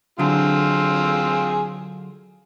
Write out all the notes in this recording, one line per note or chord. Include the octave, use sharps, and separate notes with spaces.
D3 F#3 C4 F4 G#4